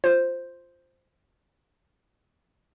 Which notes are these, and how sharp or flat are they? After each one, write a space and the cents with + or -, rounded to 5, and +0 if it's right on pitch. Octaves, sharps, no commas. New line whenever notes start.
F4 +0 C5 +0